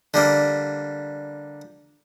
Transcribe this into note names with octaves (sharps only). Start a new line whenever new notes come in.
D3 G3 A#3